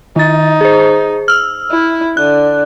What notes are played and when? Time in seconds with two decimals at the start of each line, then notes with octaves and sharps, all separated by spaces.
0.16 D#3 D#4 A6
0.61 G#4 C5
1.28 E6 F6
1.71 E4
2.17 D3 F#6